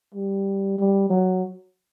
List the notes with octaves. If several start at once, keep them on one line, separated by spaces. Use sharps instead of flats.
G3
G3
F#3